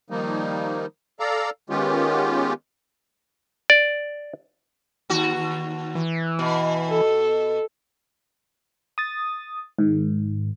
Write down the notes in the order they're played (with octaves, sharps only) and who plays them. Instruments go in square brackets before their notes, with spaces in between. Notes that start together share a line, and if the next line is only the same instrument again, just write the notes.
[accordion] D#3 F3 G3 A#3 D#4
A4 D5 F5 A#5
D#3 G#3 B3 C#4 F4 G4
[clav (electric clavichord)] D5
[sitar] D#2 F#4
[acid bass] E3
[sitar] B2
[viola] A4
[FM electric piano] D#6 A6
G#2 D#3